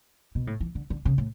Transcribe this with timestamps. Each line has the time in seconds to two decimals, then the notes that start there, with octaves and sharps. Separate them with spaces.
0.35 B2
0.47 A2
0.60 E3
0.75 D3
0.90 D3
1.05 C#3
1.18 A2